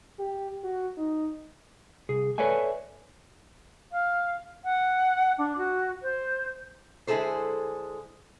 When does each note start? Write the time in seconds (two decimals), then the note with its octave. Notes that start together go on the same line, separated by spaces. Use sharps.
0.19 G4
0.64 F#4
0.97 D#4
2.09 C2 G#4
2.38 A4 B4 C#5 D5 E5 G#5
3.92 F5
4.64 F#5
5.38 D4
5.58 F#4
6.02 C5
7.07 D3 G#3 E4 G#4 A4 C5